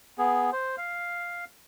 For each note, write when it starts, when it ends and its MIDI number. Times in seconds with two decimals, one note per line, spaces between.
0.18 0.50 59
0.18 0.50 68
0.52 0.76 72
0.78 1.45 77